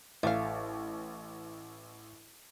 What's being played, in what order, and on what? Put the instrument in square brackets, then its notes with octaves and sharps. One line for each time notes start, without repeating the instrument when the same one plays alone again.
[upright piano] A1 [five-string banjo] A3 F5